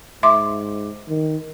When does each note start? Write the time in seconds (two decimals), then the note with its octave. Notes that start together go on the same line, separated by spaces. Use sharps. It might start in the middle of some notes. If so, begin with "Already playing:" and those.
0.23 G#2 E5 C6 D6
1.09 D#3